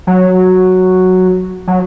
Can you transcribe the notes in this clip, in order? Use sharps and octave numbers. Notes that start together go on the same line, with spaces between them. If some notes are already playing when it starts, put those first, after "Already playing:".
F#3
F#3